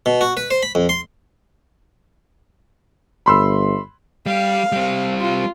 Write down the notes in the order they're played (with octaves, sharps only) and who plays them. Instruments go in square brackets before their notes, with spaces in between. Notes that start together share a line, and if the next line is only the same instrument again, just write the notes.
[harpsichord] B2
F#4
B4
C5
B5
F2
C6
[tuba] G1 [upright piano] B5 C6 E6
[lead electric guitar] G3 [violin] F5
[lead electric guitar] G3 C4
[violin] F4